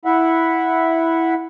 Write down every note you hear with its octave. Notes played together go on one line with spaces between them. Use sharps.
E4 E5 F#5